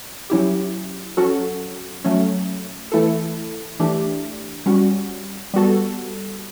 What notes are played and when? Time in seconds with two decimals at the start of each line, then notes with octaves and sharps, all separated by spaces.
0.30 F#3 C#4 E4 G4
1.17 F#3 C#4 F#4 A4
2.05 F#3 A3 C#4
2.92 E3 A3 E4 A4
3.80 E3 A3 D4 G4
4.66 G3 C#4 F#4
5.54 G3 B3 F#4 A4